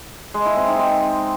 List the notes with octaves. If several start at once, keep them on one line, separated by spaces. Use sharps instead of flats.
G#3
E4
C4
D#4
C4